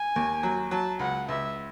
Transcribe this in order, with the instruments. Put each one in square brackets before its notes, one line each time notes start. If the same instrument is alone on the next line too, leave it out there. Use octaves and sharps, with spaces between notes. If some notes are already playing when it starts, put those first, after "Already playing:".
Already playing: [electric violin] G#5
[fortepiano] D#2
F#3
[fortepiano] F#3 [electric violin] A5
[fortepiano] C#2 [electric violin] F#5
[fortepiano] C#2 [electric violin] E5